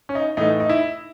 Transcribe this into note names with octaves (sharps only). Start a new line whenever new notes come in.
C#4
D#4
A2 E3 A3 D#4
D#4
E4